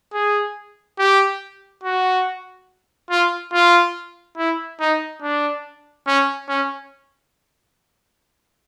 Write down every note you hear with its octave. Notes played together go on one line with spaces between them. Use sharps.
G#4
G4
F#4
F4
F4
E4
D#4
D4
C#4
C#4